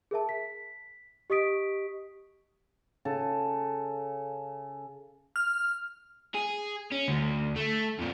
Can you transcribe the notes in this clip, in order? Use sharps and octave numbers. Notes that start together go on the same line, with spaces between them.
G#4 A#4 E5 A5
B6
G4 D#5 C#6 D#6 B6 D7
C#3 A4
F6
G#4
C#4
D2
A3
F2 A#2